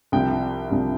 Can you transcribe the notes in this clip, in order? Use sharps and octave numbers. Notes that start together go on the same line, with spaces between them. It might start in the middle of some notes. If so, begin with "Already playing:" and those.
C2 C3 F3 G5
C2 C3 F3